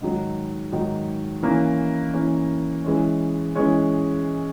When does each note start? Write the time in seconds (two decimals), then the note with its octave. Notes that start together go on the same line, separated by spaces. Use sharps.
0.01 G#2 D#3 F#3
0.72 G#2 D#3 F#3
1.43 E3 A#3 C#4
2.13 E3 A#3 C#4
2.84 E3 G#3 C#4
3.55 E3 G#3 C#4